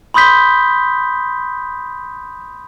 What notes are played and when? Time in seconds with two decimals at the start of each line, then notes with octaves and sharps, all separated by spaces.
0.14 B5 C6 D#6 G6 B6 G7